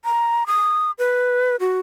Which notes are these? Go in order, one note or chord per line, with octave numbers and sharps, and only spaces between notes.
A#5
D#6
B4
F#4